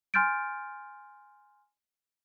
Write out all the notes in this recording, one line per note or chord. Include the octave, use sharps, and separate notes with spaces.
G#5 C6 F6 G6 A6 D7